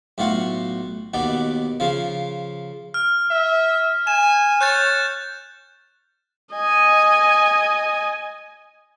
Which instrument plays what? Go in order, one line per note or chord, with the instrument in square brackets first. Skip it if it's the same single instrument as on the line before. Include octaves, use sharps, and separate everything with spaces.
[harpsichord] B1 A2 F4 F#4 F#5
D#2 B2 B3 D5
C#3 F3 F4
[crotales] F6
[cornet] E5
[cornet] G#5 [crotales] E7
[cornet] C#5 [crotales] F#6 G6 A6
[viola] D#5 G#5